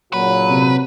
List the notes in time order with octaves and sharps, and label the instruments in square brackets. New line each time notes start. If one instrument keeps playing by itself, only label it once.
[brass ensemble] A#2 C#3 F#3 [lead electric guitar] B4
[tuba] C3